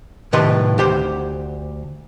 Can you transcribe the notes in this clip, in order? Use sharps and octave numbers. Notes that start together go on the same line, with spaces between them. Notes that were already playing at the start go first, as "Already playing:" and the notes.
A2 C3 D#3 B4 A5 C6
D2 G4 C5